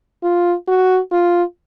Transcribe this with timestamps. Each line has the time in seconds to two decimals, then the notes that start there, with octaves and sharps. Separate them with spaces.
0.23 F4
0.68 F#4
1.12 F4